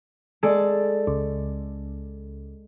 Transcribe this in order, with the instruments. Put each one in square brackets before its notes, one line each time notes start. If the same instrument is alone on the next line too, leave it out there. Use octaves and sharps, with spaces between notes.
[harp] G#3 A4 D5
[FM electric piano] C#2